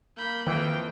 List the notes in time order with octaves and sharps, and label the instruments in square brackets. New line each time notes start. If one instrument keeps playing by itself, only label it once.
[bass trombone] A#3 [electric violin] B5 G6
[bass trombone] F2 [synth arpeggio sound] D#3 [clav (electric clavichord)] E3 [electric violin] A#3 G5